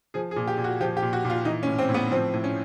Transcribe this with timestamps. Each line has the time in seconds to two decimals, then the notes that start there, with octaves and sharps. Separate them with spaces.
0.14 F3 G#4
0.31 G#4
0.36 A#2
0.47 G4
0.58 A#2
0.64 F#4
0.81 F3 G4
0.97 G4
1.02 A#2
1.13 F#4
1.24 A#2
1.30 F4
1.45 E3 D#4
1.63 C#4
1.67 A2
1.79 C4
1.89 A2
1.94 B3
2.11 F3 C4
2.34 A2
2.44 C#4